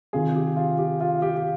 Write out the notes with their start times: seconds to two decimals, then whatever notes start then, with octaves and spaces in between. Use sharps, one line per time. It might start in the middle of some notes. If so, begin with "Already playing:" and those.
0.13 C3 D#3 F4 G#4
0.36 G4
0.56 F4
0.79 G4
1.00 F4
1.22 G4
1.37 G4